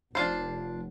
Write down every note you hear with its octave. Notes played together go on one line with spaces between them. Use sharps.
F1 D4 F4 C5